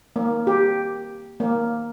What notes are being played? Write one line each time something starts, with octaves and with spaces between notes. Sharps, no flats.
A#3
G4
A#3